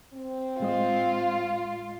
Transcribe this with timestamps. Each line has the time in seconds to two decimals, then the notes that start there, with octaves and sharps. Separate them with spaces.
0.14 C4
0.60 A2 G#3 F4 D#5